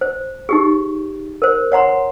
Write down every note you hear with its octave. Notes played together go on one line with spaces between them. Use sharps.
C5
D#4 G4 G#4
A#4 C5
C#5 F#5 A#5 C6